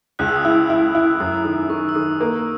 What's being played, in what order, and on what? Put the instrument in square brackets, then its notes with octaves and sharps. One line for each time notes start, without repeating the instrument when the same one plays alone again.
[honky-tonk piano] C#2 [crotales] F#6
[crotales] E6
D#6
[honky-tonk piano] E4 [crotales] E6
[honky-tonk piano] E4
E4
[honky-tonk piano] F#2 [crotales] D#6
[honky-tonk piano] D#3
[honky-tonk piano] D#3 [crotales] C#6
[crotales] E6
[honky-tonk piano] D#3 [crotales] D#6
[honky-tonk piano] A#3